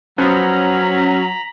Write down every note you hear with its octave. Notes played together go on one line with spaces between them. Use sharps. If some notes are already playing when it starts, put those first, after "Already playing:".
F3 F#3 B3 C#4 A#5 B5